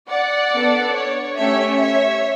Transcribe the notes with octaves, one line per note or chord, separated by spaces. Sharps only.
D5 F#5
B3 D4 A4
C#5
A3 C#4 G4 C#5 E5
C#5 E5